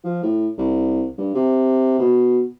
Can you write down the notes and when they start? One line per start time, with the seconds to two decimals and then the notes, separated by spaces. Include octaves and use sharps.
0.04 F3
0.23 A2
0.58 C2
1.18 G2
1.34 C3
1.99 B2